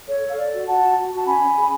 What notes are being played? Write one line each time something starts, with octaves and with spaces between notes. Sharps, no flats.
A4 C#5
A4 F5
A4 D5
F#4
F#4 F#5 A5
F#4
F#4
F#4
A5
C#4 G#5 B5
C#4
G#4